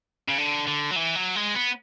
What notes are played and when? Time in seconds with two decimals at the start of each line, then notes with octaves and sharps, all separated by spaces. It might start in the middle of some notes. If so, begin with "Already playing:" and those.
0.29 C#3
0.38 D3
0.67 D3
0.91 F#3
0.96 E3
1.15 F#3
1.36 G#3
1.55 B3